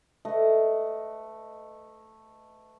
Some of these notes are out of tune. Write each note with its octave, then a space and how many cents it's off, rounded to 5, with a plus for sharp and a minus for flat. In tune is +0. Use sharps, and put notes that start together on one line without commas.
A3 +0 B4 +30 D#5 +0